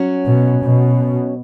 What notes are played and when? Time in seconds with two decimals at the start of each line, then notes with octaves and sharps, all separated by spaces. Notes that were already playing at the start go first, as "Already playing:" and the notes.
Already playing: F#3 C#4 F#4
0.27 B2
0.63 B2